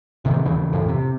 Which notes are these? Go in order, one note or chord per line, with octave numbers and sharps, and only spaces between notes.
A1 C3 D#3 E3
D#2 C#3 E3
G#1 F2 A2 E3
C3